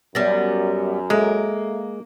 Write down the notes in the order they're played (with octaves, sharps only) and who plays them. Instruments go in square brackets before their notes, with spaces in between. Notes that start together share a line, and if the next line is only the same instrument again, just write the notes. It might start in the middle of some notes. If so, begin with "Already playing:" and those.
[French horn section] F#2 [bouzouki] G3 B3 [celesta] A6 A#6
[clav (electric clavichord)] G#3 [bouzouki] A#3 [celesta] A4 E5